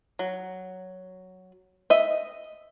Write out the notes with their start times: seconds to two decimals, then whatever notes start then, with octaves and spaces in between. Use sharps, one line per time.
0.19 F#3
1.90 D#5 E5